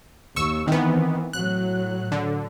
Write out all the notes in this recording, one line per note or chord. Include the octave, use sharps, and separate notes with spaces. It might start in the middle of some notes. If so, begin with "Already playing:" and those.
D#2 C#6 E6
D#3 E3 B3 C4
A2 F#3 F#6
D3